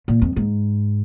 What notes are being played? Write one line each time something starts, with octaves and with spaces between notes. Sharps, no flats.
A#2
F2
G#2